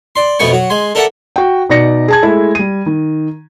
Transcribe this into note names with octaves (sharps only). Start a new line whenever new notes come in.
D5 C6
F2 B2 A3 B3 G#5 C#6
F#3 F#4
G#3 G#5 C6
A4 A#4 D5 E5 F#5 A5
F#4 G5
B2 D#4 D5 A#6 C#7
G#4 A5 G#6
G#3 A3 E4 E5
G3 D#7
D#3